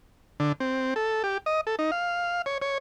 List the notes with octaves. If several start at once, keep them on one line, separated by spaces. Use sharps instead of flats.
D3
C4
A4
G4
D#5
A4
D#4
F5
C#5
C#5